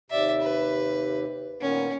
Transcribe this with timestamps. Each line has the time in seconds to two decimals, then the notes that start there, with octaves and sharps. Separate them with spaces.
0.10 D#2 C3 D5 E5
0.41 B4
1.61 A#2 D#3 B3 C#4